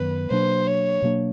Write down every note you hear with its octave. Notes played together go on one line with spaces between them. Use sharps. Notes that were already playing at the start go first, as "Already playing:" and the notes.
Already playing: F#2 D#3 F#3 B3 B4
B2 F#3 A#3 D4 C5
C#5
B2 F#3 A#3 D4